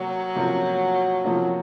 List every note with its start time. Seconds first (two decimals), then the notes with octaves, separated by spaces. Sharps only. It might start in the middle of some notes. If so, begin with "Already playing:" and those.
Already playing: C3 F#3 A#3
0.36 C3 F3 A#3 C#4 F4
1.24 C3 F3 A#3 C#4 F4